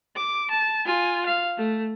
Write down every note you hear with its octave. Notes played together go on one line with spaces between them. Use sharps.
D6
A5
F4 G#5
F5
A3